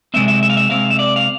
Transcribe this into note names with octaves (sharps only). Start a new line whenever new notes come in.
C3 G#3 C4 E5
E5
E5
F5
E5
C3 G#3 C4 F5
E5
D5
F5